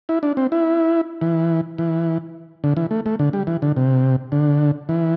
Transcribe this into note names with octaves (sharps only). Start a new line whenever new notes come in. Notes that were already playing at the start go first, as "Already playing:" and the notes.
E4
D4
C4
E4
E3
E3
D3
E3
A3
A3
D3
G3
E3
D3
C3
D3
E3